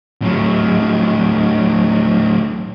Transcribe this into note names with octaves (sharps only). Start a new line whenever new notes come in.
A2 F#3